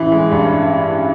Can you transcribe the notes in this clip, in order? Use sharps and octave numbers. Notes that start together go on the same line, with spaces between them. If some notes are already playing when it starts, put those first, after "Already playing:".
Already playing: A1 E3
G#3
G2